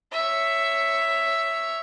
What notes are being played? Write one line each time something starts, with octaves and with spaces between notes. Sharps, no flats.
C#5 E5